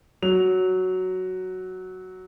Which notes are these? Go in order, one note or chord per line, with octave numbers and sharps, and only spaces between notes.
F#3 F7